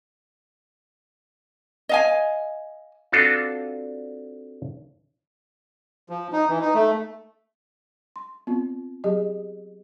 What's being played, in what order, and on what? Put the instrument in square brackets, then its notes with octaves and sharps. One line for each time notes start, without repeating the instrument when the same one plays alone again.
[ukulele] D#5 F5 G#5
[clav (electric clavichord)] C4 D4 F4 F#4 A4
[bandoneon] F3
D#4
E3
D#4
A3
[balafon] C6
B3 C4 F4
F#3 G4 G#4 D#5